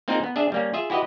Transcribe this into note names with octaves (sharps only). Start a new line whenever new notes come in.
A#3 C4 D#4 F4 G#4 A#4
B3
D4 G#4 E5
G3 A#3 C#4
F4 G#4 E5
E4 F#4 G4 B4 D#5